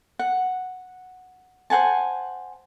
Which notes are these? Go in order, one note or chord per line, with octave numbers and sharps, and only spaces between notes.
F#5
C5 F#5 G#5 A5